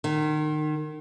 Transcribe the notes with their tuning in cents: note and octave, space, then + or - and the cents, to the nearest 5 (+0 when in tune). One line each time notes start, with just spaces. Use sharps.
D#3 -30